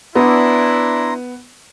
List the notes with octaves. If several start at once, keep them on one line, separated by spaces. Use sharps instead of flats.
B3 D4 E4 A#5 C6